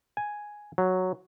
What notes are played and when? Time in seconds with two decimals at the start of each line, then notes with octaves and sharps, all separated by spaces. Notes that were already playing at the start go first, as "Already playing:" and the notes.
0.17 G#5
0.78 F#3